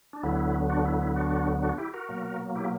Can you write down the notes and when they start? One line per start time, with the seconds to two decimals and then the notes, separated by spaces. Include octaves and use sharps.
0.13 D4
0.23 D2 D3 F#3 B3 E4
0.70 D4 F#4
0.85 E4
1.01 E4
1.16 D4 F#4
1.62 D4 F#4
1.78 E4 G4
1.94 F#4 A#4
2.09 B2 F#3 A#3
2.55 E4 G4